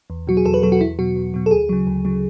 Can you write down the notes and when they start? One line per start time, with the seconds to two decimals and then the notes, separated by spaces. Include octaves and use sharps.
0.10 E2
0.27 B2 F#3 F#4
0.37 G#4
0.45 E2 A4
0.54 B4
0.63 B2 F#3 A4
0.72 F#4
0.81 E2 E4
0.99 B2 F#3 F#4
1.16 E2
1.34 B2 F#3
1.46 A4
1.51 D2 G#4
1.69 C#3 F#3
1.87 D2
2.05 C#3 F#3